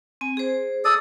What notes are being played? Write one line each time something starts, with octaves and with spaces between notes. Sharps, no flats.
C4 G#5
G#4 C5
A4 D5 D#6